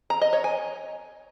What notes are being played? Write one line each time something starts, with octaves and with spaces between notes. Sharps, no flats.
A#5
D#5
C#5
G#5